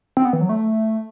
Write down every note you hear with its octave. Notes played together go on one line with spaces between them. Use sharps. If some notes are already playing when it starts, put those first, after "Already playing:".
C4
B3
E3
F#3
A3